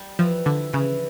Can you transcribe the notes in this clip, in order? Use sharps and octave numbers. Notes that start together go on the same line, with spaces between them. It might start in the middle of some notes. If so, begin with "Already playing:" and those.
Already playing: G3
E3 F3
D3 E4
C#3 E3